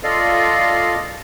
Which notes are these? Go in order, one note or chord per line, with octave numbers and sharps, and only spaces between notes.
F4 A4 D5 D#5 F5